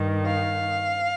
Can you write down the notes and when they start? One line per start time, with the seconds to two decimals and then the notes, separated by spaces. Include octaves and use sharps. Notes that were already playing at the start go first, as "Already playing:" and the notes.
Already playing: G2 D#3
0.26 F5